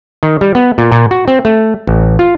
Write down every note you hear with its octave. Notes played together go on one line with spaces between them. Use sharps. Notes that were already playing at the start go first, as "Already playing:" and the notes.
D#3
G3
B3
A#2
A#2
F#4
C4
A3
A1
F4